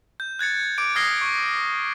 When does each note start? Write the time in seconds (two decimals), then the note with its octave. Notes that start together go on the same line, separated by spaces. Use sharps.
0.20 G6
0.39 F#6 G#6 A6 C#7
0.78 D6 D7
0.95 D#6 F6 G#6 A#6 C7 G7
1.21 C#6